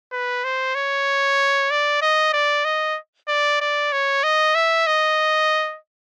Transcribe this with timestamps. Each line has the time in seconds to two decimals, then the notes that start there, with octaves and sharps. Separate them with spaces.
0.12 B4
0.44 C5
0.75 C#5
1.71 D5
2.02 D#5
2.33 D5
2.65 D#5
3.28 D5
3.61 D5
3.92 C#5
4.24 D#5
4.55 E5
4.87 D#5